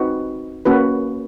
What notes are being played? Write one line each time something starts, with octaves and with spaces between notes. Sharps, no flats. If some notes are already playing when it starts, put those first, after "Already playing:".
Already playing: C4 D#4 F#4 B4
A#3 C#4 F#4 B4